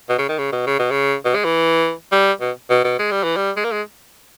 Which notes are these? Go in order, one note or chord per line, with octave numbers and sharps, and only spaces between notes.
B2
C#3
D#3
C#3
B2
C#3
B2
C#3
B2
G#3
E3
G3
B2
B2
B2
G#3
G3
E3
G3
G#3
A#3
G#3